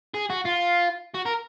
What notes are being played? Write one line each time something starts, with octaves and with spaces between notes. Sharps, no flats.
G#4
F#4
F4
F#4
A#4